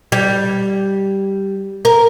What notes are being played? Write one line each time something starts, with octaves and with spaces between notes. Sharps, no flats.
G3
A#4